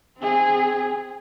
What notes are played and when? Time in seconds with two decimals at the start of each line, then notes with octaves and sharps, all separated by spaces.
0.18 C4 G#4